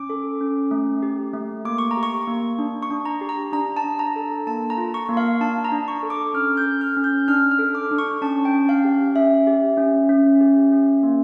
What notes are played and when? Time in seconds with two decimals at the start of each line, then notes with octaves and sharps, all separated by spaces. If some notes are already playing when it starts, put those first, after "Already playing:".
Already playing: C#4 D6
0.10 A4
0.41 C#4
0.71 A3
1.03 G4
1.34 A3
1.65 A#3 D6
1.78 C#6
1.91 A#5
1.97 G4
2.03 C#6
2.27 A#3
2.59 D4
2.83 C#6
2.91 D4
3.06 A#5
3.21 G4
3.29 A#5
3.52 D4 A#5
3.77 A5
3.84 D4
3.99 A#5
4.16 A4
4.47 A#3 A5
4.70 A#5
4.77 F4
4.94 C#6
5.09 A#3
5.17 F5
5.40 D4 A5
5.65 A#5
5.72 D4
5.88 C#6
6.03 A4
6.10 D6
6.34 C#4 F6
6.57 G6
6.66 A4
6.81 F6
6.97 C#4
7.04 G6
7.28 D4 F6
7.51 F6
7.59 A4
7.75 D6
7.91 D4
7.98 C#6
8.21 C#4 A5
8.45 G5
8.53 C#4
8.69 F5
8.85 G4
9.16 C#4 E5
9.47 G4
9.78 C#4
10.09 C#4
10.41 G4
10.72 C#4
11.03 A#3